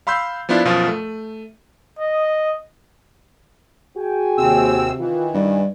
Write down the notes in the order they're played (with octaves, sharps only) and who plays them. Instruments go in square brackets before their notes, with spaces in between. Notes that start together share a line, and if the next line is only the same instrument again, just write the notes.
[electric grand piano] F5 B5 C6 E6 G6
F3 B3 D4 E4 F4
F#2 B2 F3 F4
A3
[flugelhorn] D#5
[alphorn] F#4 [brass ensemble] G#4 G5 G#5
[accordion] D#2 C4 E6 [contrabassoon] C3
[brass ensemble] D#3 [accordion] E3 [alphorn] F4
[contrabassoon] G2 [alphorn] D#4